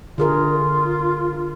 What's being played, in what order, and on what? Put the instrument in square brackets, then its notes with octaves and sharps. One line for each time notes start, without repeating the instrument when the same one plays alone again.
[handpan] D3 G#4 A#4 [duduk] F4